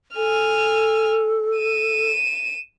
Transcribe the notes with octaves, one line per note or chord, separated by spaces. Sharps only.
A4 G#5 F6
D#7 E7